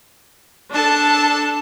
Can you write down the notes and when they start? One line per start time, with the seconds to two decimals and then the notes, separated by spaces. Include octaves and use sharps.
0.70 D4 A4 A5